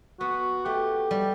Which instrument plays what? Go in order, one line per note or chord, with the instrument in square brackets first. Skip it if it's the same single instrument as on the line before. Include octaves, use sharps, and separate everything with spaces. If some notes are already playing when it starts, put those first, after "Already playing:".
[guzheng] B3 [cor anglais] F#4
[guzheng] A3 [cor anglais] G4
[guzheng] G3